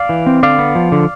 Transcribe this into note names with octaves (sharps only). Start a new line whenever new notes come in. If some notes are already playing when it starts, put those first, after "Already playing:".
Already playing: D5 F5
E3
C4
D3 D5 F5
B3
F3
D3